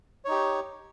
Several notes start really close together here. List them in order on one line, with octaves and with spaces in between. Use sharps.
C#5 D#4 G4